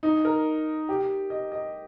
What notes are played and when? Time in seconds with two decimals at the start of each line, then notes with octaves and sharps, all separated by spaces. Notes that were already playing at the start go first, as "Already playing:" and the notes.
0.03 D#4
0.25 A#4
0.89 G4
1.30 D#5
1.52 D#5